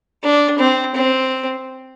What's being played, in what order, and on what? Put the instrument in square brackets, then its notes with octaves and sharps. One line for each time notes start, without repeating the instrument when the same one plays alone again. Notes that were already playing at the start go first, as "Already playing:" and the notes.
[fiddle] D4
C4
C4